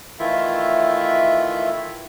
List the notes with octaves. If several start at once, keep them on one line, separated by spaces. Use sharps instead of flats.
D#3 E3 A3 E4 F4 E5